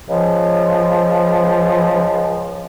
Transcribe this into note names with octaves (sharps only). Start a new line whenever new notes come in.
C#2 F3